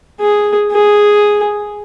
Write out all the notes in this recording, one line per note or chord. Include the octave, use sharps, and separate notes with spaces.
G#4
G#4